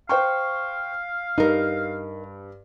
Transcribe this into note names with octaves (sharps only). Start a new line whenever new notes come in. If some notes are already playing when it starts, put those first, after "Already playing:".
C5 F5 G5 C#6
G2 D#4 A#4